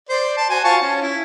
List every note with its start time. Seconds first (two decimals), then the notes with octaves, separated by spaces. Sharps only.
0.09 C5 D5
0.37 A5
0.50 F#4 C5 G#5
0.64 F4 A5 C#6
0.82 C#4
1.02 E4